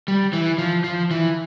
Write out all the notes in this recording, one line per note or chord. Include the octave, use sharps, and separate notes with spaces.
G3
E3
F3
F3
E3